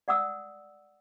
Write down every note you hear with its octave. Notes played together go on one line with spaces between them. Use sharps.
D5 F#5 D#6 E6